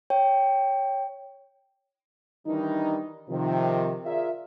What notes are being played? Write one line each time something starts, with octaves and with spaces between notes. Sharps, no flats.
C#5 G5
D#3 E3 G3 D4 D#4
C3 D#3 F3
F4 G#4 A#4 D5 E5